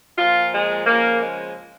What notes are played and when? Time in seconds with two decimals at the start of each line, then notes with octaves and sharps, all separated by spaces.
0.17 A#2 F3 F4
0.52 G#3
0.87 C#3 F3 A#3
1.22 G#3